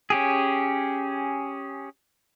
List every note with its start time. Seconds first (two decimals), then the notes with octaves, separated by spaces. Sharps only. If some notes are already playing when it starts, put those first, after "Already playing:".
0.10 C#4 G4 G#4